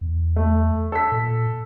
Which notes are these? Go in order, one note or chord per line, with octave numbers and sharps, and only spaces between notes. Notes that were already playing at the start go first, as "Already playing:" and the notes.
E2
A3
A4 B6
A#2